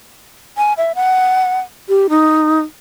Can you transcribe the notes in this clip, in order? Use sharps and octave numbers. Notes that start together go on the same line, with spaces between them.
G#5
E5
F#5
G4
D#4